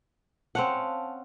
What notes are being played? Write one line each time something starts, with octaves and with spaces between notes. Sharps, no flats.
C4 C#4 F5 F#5 A5